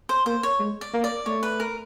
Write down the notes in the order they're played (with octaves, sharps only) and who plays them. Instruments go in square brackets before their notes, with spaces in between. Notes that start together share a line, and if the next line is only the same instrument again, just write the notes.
[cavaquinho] C5
[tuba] A#3 [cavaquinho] C5
[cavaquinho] C#5
[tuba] G#3
[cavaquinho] D5
[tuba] A#3
[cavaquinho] D5
[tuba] A3 [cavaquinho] C#5
[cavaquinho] B4
A#4